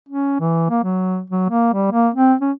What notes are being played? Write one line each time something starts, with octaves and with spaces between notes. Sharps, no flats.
C#4
E3
A#3
F#3
F#3
A#3
G3
A#3
C4
C#4